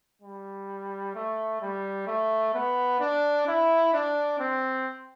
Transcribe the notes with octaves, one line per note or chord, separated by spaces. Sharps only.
G3
A3
G3
A3
B3
D4
E4
D4
C4